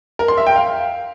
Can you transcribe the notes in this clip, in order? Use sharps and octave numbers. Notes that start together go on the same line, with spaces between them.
A#4
C6
E5
G5
F5